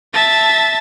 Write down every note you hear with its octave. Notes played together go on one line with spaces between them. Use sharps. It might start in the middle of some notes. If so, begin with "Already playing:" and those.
E5 A5